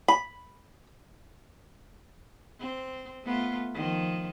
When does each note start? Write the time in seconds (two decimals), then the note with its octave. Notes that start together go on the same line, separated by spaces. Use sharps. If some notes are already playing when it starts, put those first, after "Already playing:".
0.08 B5
2.59 C4
3.24 A3 B3 F4
3.74 D#3 F3